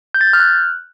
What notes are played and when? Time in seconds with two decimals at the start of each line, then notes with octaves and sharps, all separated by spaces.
0.14 G6
0.21 A6
0.27 G6
0.33 F6
0.40 F#6